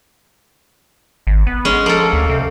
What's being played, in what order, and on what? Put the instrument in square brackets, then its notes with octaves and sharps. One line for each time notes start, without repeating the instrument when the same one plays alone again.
[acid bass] G#1
B3
[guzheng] G#3 C#4
[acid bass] F3 [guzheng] A#3 A4
[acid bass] D2
C3